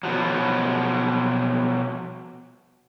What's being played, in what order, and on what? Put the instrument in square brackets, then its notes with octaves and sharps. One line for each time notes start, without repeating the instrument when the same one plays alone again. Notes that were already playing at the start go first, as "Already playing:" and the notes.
[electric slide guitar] B2 F3 F#3